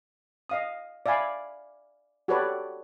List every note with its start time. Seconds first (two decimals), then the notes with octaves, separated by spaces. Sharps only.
0.49 D#5 F5 D#6
1.06 D5 E5 F5 G#5 B5
2.28 F#4 G4 A4 B4 C#5 D5